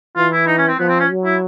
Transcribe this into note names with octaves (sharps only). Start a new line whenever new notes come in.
E3 F4
E4
D#4
C#4
C4
F3 B3
C4
C#4
F#3
E4